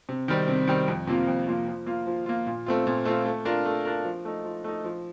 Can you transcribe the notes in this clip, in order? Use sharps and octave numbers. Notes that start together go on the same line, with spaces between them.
C3
D#3 G3 C4
C3
D#3 G3 C4
F2
C3 F3 A#3 F4
F2
C3 F3 A#3 F4
F3
A#3 F4
F3
A#3 F4
A#2
A3 C4 F4
A#2
A3 C4 F4
A3
D4 F4 A#4
A3
D4 F4 A#4
F3
A3 D#4
F3
A3 D#4
F3